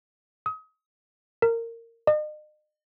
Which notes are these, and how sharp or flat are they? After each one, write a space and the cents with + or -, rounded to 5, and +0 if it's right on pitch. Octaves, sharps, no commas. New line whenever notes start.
D#6 +35
A#4 -20
D#5 -40